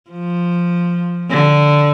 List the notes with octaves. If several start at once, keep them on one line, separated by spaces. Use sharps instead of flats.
F3
D3